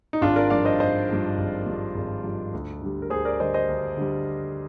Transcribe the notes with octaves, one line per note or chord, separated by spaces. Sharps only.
D#4
G#1 D4 F4
A#4 D5
G2 F3 D5 F5
C5 D#5
G#1 C5 D#5
G2 F3
G#1
G2 F3
G#1
G2 F3
D2
D3 G3
A#4
D2 G#4 C5
A#4 D5
D3 G3 C5 D#5
C5 D#5
D2
D3 G3